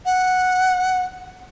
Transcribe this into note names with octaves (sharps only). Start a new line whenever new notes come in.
F#5